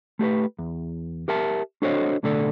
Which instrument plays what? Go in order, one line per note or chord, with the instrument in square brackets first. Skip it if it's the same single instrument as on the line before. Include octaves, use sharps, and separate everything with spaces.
[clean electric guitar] A3 G4 A4 B4
E2
G4 A#4 E5 A5
D4 F#4 A4 C5 C#5 D#5
B1 A2 D3 A3 A4 D5